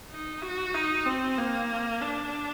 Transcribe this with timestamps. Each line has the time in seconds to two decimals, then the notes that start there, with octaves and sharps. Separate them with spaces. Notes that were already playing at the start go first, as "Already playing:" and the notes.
0.11 D#4
0.42 F#4
0.74 D#4
1.06 C4
1.38 A#3
2.01 D4